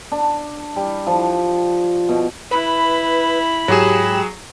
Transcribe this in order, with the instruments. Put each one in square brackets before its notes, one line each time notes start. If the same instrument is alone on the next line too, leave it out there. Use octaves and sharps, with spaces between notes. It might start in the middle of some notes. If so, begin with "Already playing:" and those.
[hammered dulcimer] D4
G3
F3
B2
[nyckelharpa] E4 [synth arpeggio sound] B4 [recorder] B5
[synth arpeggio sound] G#2 G4 E7 [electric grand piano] F#3 G#4